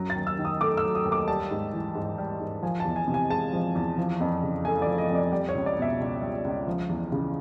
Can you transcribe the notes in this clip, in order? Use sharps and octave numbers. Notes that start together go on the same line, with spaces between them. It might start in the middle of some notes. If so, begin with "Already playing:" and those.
Already playing: F#2 F#3
A6
D#2
E6
D#3
D#6
A3 D6
E6
F#3
D#6
D#2
D6
G3 A5
G#2
E3
G#2
G3
G#2
F3 G#5
A5
E2
G#5
C3
G#5
G#3 A5
F3
E2
F3
F2
C#3
A3 G#5
D5
F3
D#5
F2
D5
G3 D5
C#5
C#2
D5
B2 E5
C#2
G3
C#2
F3
E2
C#3